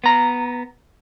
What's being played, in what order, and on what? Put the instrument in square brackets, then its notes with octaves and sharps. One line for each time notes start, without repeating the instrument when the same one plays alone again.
[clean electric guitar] B3 A#5